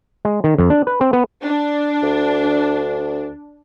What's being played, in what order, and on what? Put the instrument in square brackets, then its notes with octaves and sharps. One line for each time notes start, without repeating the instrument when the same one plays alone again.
[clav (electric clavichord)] G#3
D#3
F2
D4
B4
C4
B3
[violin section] D4
[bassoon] D2